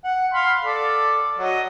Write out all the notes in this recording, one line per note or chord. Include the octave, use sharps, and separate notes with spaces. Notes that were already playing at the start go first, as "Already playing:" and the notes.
F#5
F5 B5 C6
A4 D5
F#3 F#4 D#5